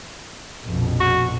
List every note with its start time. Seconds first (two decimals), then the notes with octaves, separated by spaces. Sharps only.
0.66 A#1 F2 B2
1.00 F#4